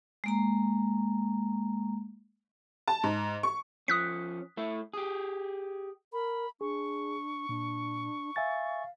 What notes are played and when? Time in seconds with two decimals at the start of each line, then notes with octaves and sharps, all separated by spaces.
0.24 G#3 A#3 A#5
2.88 A5
3.04 G#2
3.43 C#6
3.88 F3 C#4 D#6 F#6 B6
4.57 A3 E4
4.94 G4 G#4
6.13 A#4 B5
6.61 D4 G#4 C#6
7.49 A#2 D4
8.36 E5 F5 G#5 A6